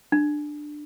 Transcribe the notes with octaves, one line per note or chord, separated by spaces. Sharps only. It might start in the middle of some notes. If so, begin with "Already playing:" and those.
D4